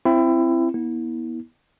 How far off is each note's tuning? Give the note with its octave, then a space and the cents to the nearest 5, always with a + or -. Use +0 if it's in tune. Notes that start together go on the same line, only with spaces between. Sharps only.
C4 +0 E4 +25
B3 -35 E4 -30